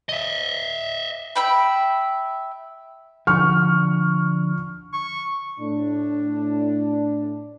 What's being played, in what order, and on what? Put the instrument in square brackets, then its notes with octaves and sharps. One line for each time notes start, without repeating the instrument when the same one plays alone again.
[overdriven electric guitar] D#5 E5
[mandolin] E5 G5 B5
[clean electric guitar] D3 F3 [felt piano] C#6 F6
[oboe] C#6
[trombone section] A2 D4